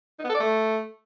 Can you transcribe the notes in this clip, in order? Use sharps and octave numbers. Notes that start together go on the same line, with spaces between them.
D#4
B3
A4
D5
A3